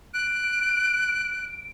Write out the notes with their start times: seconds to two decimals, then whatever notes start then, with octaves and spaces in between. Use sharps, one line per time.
0.14 F#6 D7